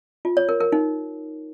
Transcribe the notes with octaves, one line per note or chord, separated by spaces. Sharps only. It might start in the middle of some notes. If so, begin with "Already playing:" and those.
F4
C#5
A#4
A#4
D#4